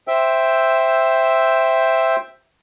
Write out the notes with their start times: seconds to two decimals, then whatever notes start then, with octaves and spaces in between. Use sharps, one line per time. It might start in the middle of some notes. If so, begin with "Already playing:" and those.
0.08 C5 E5 G5 E6